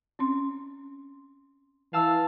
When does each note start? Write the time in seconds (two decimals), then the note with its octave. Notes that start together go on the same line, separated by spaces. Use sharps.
0.19 C4 C#4 C6
1.93 E3 F5 A5 E6